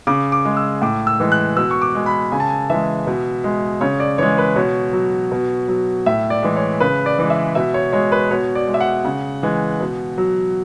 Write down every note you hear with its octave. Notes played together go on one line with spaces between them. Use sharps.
C#3 D6
D6
G#3
E6
A2 D6
E6
E3 G#3
F#6
B2 E6
C#6
D6
G#3
B5
C#3 G#5
A5
G#5
E3 G#3 E5
B2
G#3
C#3 C#5
D5
E3 G#3 C#5
B4
B2 C#5
F#3
B2
F#3
A2 E5
D5
E3 G#3
C#5
C#3 B4
D5
E3 G#3
E5
B2 E5
C#5
G#3 C#5
B4
B2 C#5
D5
G#3
E5
F#5
C#3
E3 G#3
B2
F#3